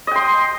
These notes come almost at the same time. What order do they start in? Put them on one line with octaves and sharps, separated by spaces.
D#5 G5 C6